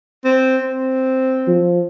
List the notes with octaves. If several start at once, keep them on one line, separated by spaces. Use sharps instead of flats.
C4
C4
F3